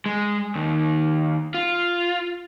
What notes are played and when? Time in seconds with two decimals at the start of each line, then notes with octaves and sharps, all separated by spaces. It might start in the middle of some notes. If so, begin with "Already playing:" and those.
0.06 G#3
0.55 D#2
1.54 F4